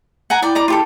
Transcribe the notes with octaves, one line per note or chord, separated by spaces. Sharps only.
F#5 G#5 A#5
E4 D5 G5
D5 A#5 D6
F4 G4 A4